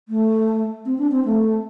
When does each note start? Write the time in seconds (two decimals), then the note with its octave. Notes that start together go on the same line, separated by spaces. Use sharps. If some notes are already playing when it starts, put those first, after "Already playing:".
0.09 A3
0.85 C4
0.98 D4
1.11 C4
1.25 A3